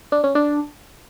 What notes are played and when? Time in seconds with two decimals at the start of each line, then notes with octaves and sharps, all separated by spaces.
0.12 D4
0.24 C#4
0.35 D4